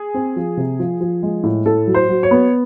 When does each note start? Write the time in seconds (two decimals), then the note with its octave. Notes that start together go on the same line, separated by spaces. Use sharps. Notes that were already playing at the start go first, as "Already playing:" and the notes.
Already playing: G#4
0.14 C4
0.36 F3
0.57 C3
0.79 F3
1.01 F3
1.23 G#3
1.43 A2
1.66 A2 A4
1.87 F#3
1.94 C5
2.09 F#3
2.23 C#5
2.31 B3